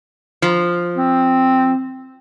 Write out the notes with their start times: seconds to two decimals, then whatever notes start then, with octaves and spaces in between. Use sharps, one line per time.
0.42 F3
0.97 C4